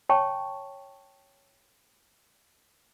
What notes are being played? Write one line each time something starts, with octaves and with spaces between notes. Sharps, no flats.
C#5 G5 A5 C#6